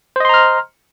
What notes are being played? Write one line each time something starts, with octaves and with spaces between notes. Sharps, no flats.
C5 D#5 A#5 C6 F6